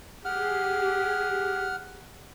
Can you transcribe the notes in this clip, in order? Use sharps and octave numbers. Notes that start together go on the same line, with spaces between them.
G4 G#4 F#5 F6